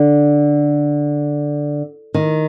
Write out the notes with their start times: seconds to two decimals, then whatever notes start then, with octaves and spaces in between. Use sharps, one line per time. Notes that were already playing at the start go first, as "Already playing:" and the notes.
Already playing: D3
2.14 D#3